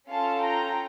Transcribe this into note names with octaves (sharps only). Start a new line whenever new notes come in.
C#4 F4 A4 F5 A5
G5 A#5